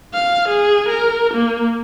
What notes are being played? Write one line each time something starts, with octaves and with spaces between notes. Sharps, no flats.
F5
G#4
A#4
A#3